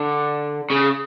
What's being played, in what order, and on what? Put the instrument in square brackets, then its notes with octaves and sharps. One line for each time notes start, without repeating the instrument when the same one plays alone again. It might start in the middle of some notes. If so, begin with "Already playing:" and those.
Already playing: [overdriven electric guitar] D3
C#3